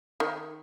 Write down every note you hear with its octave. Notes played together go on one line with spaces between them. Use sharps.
D#3